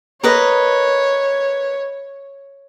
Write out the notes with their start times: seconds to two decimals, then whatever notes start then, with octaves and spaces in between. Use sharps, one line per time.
0.23 A#4 B4 C#5 D#5